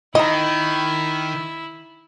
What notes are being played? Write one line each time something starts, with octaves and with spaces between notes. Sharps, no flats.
D#3 E4 D#5 A#5